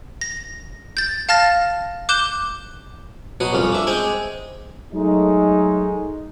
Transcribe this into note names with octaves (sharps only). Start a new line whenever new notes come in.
A#6
G6 A6
F5 A5 F6 A6 A#6
D6 F#6 G6 E7 G7
B2 F#3 F#4 D#6
C2 F2 C#4
D4 E5
G#3 C4 G5 G#5
F#3 G#3 A3 D#4